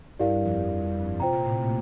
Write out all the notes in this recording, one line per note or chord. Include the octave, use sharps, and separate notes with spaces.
G2 E4 G4 A#4 D5 F5
F2
C3 F4 C5 G5 A#5
A#2
A2